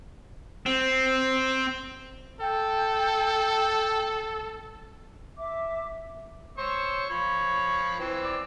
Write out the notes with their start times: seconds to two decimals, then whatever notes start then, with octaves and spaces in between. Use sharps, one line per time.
0.66 C4
2.41 A4 G5
5.37 E5 D6
6.58 C5 C#5 C#6 E6
7.10 F3 C#5 B5
7.99 E3 C4 E6
8.24 D5